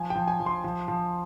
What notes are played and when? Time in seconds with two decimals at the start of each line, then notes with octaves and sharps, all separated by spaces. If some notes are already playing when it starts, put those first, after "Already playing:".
Already playing: F3 G#5
0.10 G5
0.15 F3
0.28 G#5
0.40 F3
0.46 C6
0.64 F3
0.88 F3